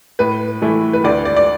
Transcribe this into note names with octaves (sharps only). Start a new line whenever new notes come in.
A2 B4
E3 A3 E4
B4
D2 D5
D5
D5